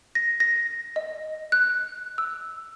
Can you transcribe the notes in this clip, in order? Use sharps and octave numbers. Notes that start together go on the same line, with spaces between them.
A#6
A#6
D#5
F#6
E6